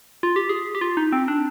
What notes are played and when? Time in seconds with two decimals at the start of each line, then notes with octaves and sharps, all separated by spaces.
0.23 F4
0.36 G4
0.49 G#4
0.75 G4
0.81 F4
0.97 D#4
1.12 C4
1.28 D4